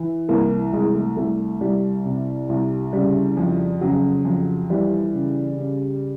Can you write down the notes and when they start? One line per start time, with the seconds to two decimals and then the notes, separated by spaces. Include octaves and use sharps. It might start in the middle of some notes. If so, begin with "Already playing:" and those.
Already playing: E3
0.29 C2 A#3
0.73 C2 G#3
0.95 A3
1.17 C2 A3
1.61 C2 G3
2.05 C3
2.49 C2
2.93 C#3 G3
3.37 F2
3.81 C#3 F#3
4.25 F2
4.70 E3 G3
5.13 C#3
5.58 C#3